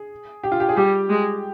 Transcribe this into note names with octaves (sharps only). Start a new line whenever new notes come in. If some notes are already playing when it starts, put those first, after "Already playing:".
Already playing: G#4
G4
F4
G4
G#4
G3 G4
G#3